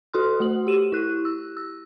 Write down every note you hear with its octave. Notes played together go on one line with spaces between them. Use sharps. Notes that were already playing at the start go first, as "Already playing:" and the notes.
F#4 A4 C6 F6
A3 F#4 F#7
G4 D#7 E7
E4 F#6
E6
E6